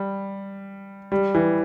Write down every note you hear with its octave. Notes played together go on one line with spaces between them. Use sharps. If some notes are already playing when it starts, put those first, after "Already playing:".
Already playing: G3
G3
E3